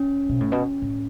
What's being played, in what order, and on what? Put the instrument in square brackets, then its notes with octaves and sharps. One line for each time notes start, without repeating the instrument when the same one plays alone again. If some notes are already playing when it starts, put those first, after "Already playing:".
Already playing: [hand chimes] C#4
[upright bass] B2
A2
B2
A2